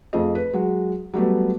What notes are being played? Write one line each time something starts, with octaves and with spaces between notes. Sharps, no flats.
F2 A3 G#4 D#5
B4
F#3 G#3
F#3 G3 A3 B3